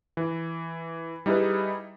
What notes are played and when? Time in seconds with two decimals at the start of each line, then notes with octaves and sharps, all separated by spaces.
0.17 E3
1.26 G3 D#4 E4 G#4 B4